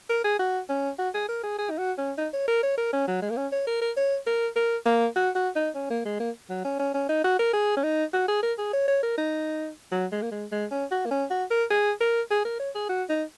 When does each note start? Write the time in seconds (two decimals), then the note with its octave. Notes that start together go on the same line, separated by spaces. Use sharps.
0.10 A#4
0.25 G#4
0.39 F#4
0.69 C#4
0.99 F#4
1.14 G#4
1.29 A#4
1.44 G#4
1.59 G#4
1.71 D#4
1.79 F#4
1.98 C#4
2.18 D#4
2.34 C#5
2.48 A#4
2.63 C#5
2.78 A#4
2.93 C#4
3.08 F#3
3.22 G#3
3.30 A#3
3.37 C#4
3.52 C#5
3.67 A#4
3.82 A#4
3.97 C#5
4.27 A#4
4.56 A#4
4.86 A#3
5.16 F#4
5.35 F#4
5.56 D#4
5.75 C#4
5.90 A#3
6.05 G#3
6.20 A#3
6.50 F#3
6.65 C#4
6.80 C#4
6.94 C#4
7.09 D#4
7.24 F#4
7.39 A#4
7.54 G#4
7.77 C#4
7.84 D#4
8.13 F#4
8.28 G#4
8.43 A#4
8.59 G#4
8.73 C#5
8.88 C#5
9.03 A#4
9.18 D#4
9.92 F#3
10.12 G#3
10.22 A#3
10.32 G#3
10.52 G#3
10.71 C#4
10.92 F#4
11.06 A#3
11.11 C#4
11.31 F#4
11.51 A#4
11.71 G#4
12.01 A#4
12.31 G#4
12.45 A#4
12.60 C#5
12.75 G#4
12.89 F#4
13.10 D#4